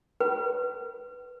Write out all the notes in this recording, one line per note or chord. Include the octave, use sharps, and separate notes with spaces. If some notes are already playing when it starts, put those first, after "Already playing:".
B4